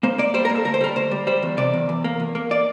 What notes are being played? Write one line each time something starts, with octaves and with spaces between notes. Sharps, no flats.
A#3 C5
A#3 D5
G3 C5
A#4
A#3
A4
D2 A#4
C5
G3 A#4
D2 C5
G3
G3 C5
E2
C3 D5
E2
E2
A#3
E2
A#3
D5